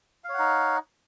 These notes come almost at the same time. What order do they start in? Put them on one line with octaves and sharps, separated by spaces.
F5 C#5 F#5 D#4